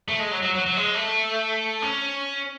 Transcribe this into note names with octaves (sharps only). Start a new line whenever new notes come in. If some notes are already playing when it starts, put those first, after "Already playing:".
A3
G#3
F#3
F#3
F#3
F#3
G#3
A3
C#4